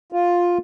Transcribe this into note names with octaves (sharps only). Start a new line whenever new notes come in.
F4